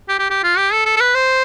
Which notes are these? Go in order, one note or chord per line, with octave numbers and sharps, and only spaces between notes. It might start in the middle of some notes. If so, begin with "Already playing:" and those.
G4
G4
G4
F4
G4
A4
A4
A4
B4
C5